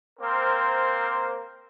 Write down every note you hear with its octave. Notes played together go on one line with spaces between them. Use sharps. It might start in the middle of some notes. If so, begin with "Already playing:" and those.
A#3 C4 A#4 C5